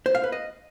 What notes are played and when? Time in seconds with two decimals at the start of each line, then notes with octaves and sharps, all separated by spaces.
0.06 C5
0.15 F5
0.24 B4
0.32 D#5